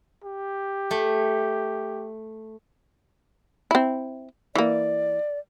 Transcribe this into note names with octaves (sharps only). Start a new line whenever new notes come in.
G4
A3
C4 E4
E3 A#3 D5